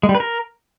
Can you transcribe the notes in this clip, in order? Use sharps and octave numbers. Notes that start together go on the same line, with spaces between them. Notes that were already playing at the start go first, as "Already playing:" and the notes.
G#3
G3
B4
A#4